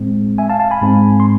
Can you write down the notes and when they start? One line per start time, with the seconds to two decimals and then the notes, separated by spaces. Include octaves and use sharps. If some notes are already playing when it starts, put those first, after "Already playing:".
Already playing: A2 G#3 C4
0.38 E5 G#5
0.50 F5 A5
0.60 F5 A5
0.71 G#5 B5
0.81 G#2 G#3 C4
1.20 C6